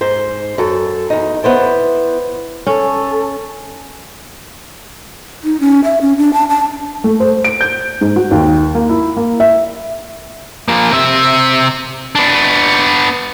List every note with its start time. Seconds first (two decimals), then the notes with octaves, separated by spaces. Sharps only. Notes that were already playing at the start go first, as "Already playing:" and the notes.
0.01 G#2 C5
0.58 F#2 A4
1.10 E2 D#4
1.43 B3 E4 C5 D5
2.67 C#4 A4
5.44 D#4
5.60 C#4
5.84 E5
6.01 C#4
6.18 D4
6.33 A5
6.50 A5
7.04 A3
7.20 C5
7.44 D7
7.61 G6
8.01 G#2
8.16 F#4
8.31 D#2
8.75 A#3
8.89 E4
9.17 A#3
9.40 E5
10.68 F3 A#3
10.91 C3 E5
12.15 B3 D4